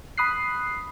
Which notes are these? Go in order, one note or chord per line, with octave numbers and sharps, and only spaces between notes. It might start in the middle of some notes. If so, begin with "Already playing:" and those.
B5 D#6 F#6 C7